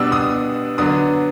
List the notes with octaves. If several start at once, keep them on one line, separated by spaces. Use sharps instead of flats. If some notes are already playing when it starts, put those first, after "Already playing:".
Already playing: B2 G3 B3 D4 E6
D#6
D3 F#3 B3 D4 D#6